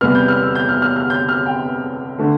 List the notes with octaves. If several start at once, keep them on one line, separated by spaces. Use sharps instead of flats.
E2 C3 G3 B3 F6
G6
F6
E6
G6
F6
F6
F6
G6
F6
G5
D3 A3